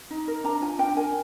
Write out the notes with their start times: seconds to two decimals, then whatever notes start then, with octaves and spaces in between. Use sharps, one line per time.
0.10 D#4
0.28 A#4
0.44 D4 A#5
0.61 F4 G#5
0.79 D4 G5
0.96 A#4 G#5